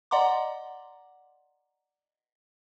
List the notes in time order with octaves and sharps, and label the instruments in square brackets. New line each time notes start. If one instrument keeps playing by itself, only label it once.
[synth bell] D5 D#5 F#5 A#5 C6 D6